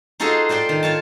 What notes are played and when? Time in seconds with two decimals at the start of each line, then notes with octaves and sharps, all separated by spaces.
0.20 D#4 F4 F#4 G#4 A4 C5
0.49 F4 C5 D5 G5
0.69 D#3
0.83 F4 C#5 A5